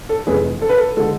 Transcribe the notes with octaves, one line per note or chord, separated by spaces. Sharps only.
A4
F1 F2 E3 G#4 B4
A4
B4
A4
D3 G#3 A4